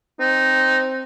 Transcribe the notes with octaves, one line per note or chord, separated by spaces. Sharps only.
C4 D#4